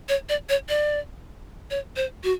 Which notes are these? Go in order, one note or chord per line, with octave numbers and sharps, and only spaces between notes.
C#5
D5
C#5
D5
C#5
C5
F#4